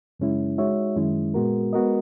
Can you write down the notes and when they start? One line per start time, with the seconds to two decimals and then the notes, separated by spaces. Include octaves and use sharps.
0.20 F#2 C#3 G#3 C#4 E4
0.58 G#3 D#4 F#4 C#5 E5
0.96 F#2 D#3 G#3 C#4 E4
1.34 A#2 G#3 B3 F#4 A#4
1.73 G#3 B3 F#4 A#4 D#5